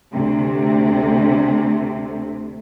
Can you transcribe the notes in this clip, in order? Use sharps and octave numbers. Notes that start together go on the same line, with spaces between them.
D2 C3